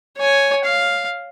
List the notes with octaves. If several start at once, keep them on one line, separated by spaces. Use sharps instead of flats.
C#5 G#5
F5